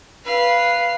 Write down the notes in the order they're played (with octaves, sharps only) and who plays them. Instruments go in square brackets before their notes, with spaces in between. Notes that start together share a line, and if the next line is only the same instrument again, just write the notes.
[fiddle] B4 F5